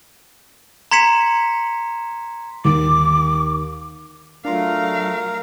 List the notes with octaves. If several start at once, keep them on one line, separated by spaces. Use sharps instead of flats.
A#5 C6 G#6 B6 C#7 E7
D#2 D6
F#3 A3 D4 F4 A#4 F5